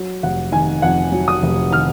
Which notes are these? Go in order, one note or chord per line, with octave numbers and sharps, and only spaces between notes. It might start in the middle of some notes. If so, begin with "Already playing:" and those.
Already playing: F#3
F1 F#5
D#3 G#5
F2 F#5
F#3
D#6
F1
D#3 F6